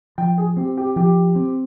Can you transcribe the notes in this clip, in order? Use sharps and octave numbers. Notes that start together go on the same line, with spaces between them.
F3 G5
G#4
C4 G4
G4
F3 G4
C4